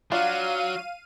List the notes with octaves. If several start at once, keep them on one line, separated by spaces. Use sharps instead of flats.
F#3 D4 F4 F5 D#7